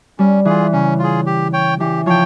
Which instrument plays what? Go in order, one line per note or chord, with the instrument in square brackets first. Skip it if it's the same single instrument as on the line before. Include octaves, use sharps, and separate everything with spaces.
[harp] G3 [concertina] C#4
[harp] E3 [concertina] F4 G#4
[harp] C#3 [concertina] C#4
[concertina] F4 G#4
G4
C#5 G5
[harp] E3 [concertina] G4
[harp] F3 [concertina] C#5 G5